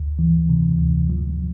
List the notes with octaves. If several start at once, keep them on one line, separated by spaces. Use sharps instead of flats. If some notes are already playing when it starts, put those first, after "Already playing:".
Already playing: D2
E3
C3
D2
F3